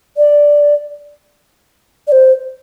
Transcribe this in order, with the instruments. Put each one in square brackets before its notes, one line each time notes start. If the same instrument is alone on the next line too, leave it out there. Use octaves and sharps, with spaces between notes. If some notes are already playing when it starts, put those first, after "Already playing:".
[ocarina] D5
D5
C5